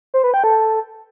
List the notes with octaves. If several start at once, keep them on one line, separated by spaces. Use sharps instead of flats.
C5
B4
G5
A4